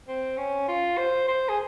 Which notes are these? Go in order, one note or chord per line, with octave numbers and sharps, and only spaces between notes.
C4
C#4
F4
C5
C5
G#4